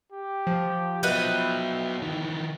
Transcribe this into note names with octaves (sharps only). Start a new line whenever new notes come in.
G4
F3
F#3 B3 B4 D#5 E5 G5
D#3 E3